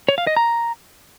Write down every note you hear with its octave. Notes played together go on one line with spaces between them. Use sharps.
C#5
F5
D#5
A#5